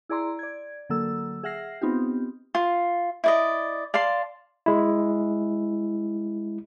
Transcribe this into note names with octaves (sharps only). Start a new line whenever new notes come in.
E4 G#4 D5 A#5 C6
D5 G#6
D3 F#3 A#3 A4 E6
G#4 E5 F#5 F6 A#6 C7
B3 C4 D#4 F4 G4
F4
E4 D5 D#5
D5 F5 A5 C6
G#3 E4